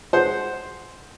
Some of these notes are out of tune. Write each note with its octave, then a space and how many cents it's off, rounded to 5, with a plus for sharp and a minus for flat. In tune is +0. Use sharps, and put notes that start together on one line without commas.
G#4 +5 C5 +0 F#5 +0